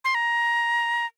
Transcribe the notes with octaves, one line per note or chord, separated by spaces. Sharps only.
C6
A#5